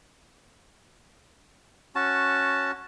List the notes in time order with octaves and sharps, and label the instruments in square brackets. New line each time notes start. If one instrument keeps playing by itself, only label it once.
[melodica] C#4 F#4 A5